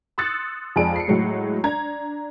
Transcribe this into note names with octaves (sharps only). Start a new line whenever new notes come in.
C6 D#6 E6 F#6 A6 C#7
F2 G#3 G#4 D5 D7
C7 C#7
A2 F#3 G#3
D4 A#5 G#6